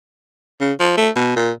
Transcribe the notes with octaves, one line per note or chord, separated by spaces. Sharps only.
C#3
F3
A3
B2
A#2